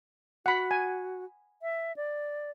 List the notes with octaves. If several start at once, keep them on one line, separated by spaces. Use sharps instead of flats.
F#4 F#5 B5
G#5
E5
D5